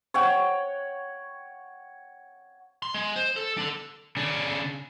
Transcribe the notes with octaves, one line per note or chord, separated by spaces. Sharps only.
C#5 F#5 G5
C6
G#3
C5
A4
D4 A4
C#3 D4